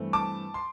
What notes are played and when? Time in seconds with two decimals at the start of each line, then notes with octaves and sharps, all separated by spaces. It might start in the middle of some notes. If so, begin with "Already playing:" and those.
Already playing: G2 E3 A3 C4
0.13 A5 D6
0.54 C6